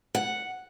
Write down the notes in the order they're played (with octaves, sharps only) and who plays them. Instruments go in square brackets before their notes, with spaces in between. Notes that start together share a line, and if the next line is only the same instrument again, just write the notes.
[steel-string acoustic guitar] F#5